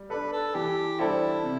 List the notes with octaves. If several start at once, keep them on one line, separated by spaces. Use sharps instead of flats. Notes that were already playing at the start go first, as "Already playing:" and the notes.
Already playing: G3
D4 A4 B4
A4
E3 G4
G3 D4 E4 A4 C5
C3